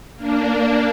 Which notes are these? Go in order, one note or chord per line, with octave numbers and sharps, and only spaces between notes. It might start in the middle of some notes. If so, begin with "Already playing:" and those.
A#3 D4